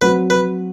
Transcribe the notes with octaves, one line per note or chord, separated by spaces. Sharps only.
F#3 C4 F#4 B4 C5
B4